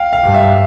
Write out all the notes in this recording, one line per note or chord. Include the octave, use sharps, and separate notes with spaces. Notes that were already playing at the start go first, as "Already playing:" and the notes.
Already playing: F5 G5
F5
G2
E5